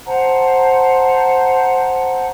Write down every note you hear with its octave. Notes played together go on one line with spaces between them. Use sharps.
C5 F#5 A5 A#5